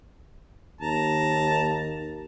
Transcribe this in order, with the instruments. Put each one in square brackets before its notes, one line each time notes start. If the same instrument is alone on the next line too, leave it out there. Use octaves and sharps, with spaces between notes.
[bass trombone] D#2 [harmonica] A5 A#5